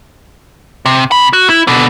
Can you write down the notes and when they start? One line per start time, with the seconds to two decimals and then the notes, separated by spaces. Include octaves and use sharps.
0.85 C3
1.12 C3 B5
1.33 F#4
1.50 E4
1.67 B2 D3